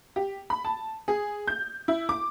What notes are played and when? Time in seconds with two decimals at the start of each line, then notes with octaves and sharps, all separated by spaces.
0.16 G4
0.50 B5
0.65 A5
1.08 G#4
1.47 G6
1.88 E4
2.09 D6